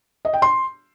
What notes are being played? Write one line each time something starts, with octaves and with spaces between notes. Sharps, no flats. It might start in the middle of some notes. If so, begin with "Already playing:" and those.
D#5
G5
C6